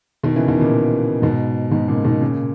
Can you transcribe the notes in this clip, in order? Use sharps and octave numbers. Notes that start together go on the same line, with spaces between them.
B2 D#3
C#3 E3
B2 D#3
A#2 C#3
G#2 B2
G#2 B2
A#2 C#3
B2 D#3
A#2 C#3